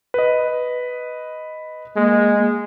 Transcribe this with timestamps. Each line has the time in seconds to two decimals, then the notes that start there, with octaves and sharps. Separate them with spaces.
0.14 B4 D#5
1.96 G#3 A#3